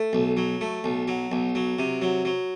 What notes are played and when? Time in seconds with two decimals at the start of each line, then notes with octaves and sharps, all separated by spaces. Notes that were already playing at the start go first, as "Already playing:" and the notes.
Already playing: A3
0.13 B1
0.37 F#3
0.61 A3
0.84 B1
1.08 F#3
1.32 B1
1.55 F#3
1.79 C3
2.02 F#3
2.25 F#3